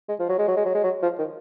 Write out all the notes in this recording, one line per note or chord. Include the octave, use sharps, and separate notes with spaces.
G#3
F3
F#3
G#3
F#3
G#3
F#3
G#3
F#3
F3
D#3